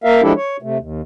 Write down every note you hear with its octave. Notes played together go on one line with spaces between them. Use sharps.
A#3 A#4 E5 F5
F3 G#3 D4 E4 G4 A4
C#5
C3 A3
D#2